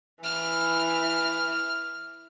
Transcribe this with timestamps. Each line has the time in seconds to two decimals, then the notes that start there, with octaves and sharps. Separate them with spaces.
0.24 E3 F6